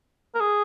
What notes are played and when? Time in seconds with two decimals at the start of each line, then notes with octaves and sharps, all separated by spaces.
0.35 A#4
0.40 G#4